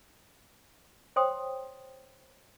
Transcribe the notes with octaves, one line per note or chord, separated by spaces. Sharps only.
C5 C#5 G5 C6 D#6